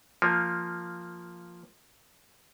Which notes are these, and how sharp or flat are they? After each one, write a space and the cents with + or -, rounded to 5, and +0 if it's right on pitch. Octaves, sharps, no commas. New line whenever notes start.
F3 +0 A#3 -5